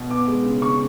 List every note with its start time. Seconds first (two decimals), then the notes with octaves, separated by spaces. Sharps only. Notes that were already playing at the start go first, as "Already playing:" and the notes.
Already playing: B2
0.10 B3 D6
0.28 G#3
0.45 C#3
0.62 C#3 C#6